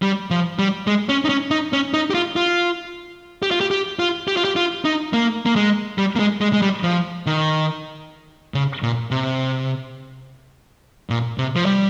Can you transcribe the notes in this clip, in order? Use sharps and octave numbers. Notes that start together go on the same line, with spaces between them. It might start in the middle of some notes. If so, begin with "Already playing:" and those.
G3
F3
G3
G#3
C#4
D#4
C#4
D#4
C#4
D#4
G4
F4
F4
G4
F4
G4
G4
F4
G4
F4
G4
F4
D#4
A#3
A#3
G#3
G3
A#3
G#3
G#3
G#3
G3
F3
D#3
C#3
A#2
C3
A#2
C3
F3
G3